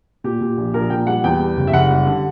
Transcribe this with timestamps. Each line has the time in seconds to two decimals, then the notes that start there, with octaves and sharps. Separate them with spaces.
0.24 A#2 G4
0.41 A#2
0.57 A#1
0.74 A#1 A#4
0.90 A#2 G5
1.07 G3 F#5
1.24 E2 G5
1.39 G3
1.57 F#1
1.67 E5
1.73 F#1 F#5
1.90 G3
2.06 D3